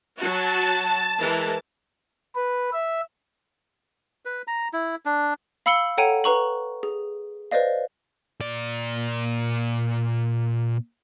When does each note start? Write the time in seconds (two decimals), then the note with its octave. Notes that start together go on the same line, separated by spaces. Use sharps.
0.19 F#3 F#4 A5
1.19 E3 G#3 A#4
2.35 B4
2.73 E5
4.25 B4
4.47 A#5
4.73 E4
5.05 D4
5.66 F5 B5 E6 C#7 F#7 G7
5.98 A4 C#5 F#5 G5 A#5 D#7
6.24 B4 A#5 C#6 F#7
6.83 G#4
7.51 B4 C5 D5 D#5 F5
8.40 A#2 D5